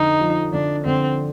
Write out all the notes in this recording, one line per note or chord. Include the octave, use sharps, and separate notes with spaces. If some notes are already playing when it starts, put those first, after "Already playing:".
Already playing: F2 D3 D#4
F3
D3 D4
D3 C4